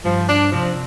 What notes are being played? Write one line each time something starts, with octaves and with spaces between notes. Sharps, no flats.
G2 F3 G3
D4
C3 F3 C4